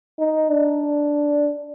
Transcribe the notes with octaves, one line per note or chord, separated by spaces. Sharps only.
D#4
D4